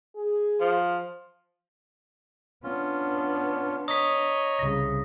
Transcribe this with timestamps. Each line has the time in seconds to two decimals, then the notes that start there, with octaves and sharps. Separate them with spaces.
0.16 G#4
0.60 F3
2.63 B3 C#4 D4 F4
3.88 C#5 D#5 A#5 D#6 B6
4.59 C2 C#3 A#6